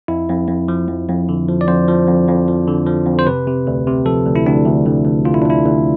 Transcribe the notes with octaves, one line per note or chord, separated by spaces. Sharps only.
F2 E4
F2
F2
F3
F2
F2
D3
F3
D5
F2 C5
F3
F2
F2
F3
D3
F3
F2
C5
C3 B4
C3
D2
C3
F3 A4
D2
E4
D2 D4
D2
D2
D2
D2 F4
E4
D4
D2 E4
D2